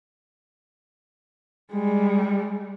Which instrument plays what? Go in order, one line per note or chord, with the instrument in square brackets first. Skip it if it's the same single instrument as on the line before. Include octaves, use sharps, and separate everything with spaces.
[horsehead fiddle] G3 G#3